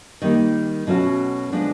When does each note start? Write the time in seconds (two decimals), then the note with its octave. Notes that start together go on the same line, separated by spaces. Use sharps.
0.22 D#3 G3 A#3 D#4
0.87 B2 F#3 A3 C#4 F#4
1.52 D3 F3 G#3 B3 D4